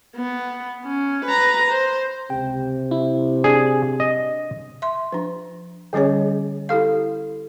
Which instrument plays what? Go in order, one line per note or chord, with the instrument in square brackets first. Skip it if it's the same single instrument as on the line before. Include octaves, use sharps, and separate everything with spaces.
[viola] B3
C#4
B4 A#5
C5
[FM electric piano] C#2 G5 [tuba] C3
[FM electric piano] E4
[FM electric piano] D4 [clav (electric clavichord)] G#4
[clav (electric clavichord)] D#5
[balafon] E5 C6
F3 D4
D3 G3 C#4 G#4 C#5
E4 G4 A4 F5